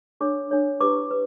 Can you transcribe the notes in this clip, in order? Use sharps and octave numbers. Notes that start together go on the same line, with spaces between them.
D4 A4 C#5 D6
D4 A4 C#5
E4 G4 B4 D6
B4